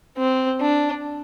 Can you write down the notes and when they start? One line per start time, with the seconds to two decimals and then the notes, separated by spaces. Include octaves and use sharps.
0.18 C4
0.61 D4